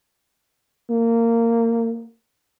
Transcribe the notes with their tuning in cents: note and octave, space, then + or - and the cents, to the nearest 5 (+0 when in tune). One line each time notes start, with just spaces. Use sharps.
A#3 -20